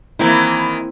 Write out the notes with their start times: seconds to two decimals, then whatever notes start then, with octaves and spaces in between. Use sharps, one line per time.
0.19 D#3 E3 A#3 C4 E4